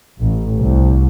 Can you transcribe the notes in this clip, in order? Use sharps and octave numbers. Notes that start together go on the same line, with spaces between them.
A1
C2